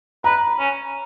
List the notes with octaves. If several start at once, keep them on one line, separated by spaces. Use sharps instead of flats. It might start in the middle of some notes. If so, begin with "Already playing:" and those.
B4 A#5
C#4